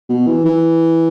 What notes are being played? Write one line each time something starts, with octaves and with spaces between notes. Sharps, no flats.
B2
E3
E3